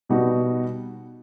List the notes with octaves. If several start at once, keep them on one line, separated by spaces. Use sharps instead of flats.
B2 G3 B3 D#4 F#4